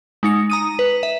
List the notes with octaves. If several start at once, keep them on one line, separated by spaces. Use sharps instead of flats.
G#3 D#4 C#7
A#5 D#6 D#7
B4
E5